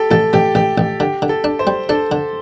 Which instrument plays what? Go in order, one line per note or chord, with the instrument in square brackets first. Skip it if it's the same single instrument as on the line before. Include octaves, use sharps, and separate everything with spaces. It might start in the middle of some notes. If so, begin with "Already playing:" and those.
Already playing: [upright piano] G4 A4
[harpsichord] A1 [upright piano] A4
[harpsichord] A1 [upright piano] G4
[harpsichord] A1 [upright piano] G4
[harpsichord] A1
[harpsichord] D3 [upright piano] G4
[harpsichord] D3
[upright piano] A4
[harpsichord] D4
[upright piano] C5
[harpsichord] G3
[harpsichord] D4 [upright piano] A4
[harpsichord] D3